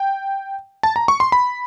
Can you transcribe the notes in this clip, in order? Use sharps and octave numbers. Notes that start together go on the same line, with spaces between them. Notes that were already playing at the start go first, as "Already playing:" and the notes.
Already playing: G5
A5
A#5
C#6
C6
B5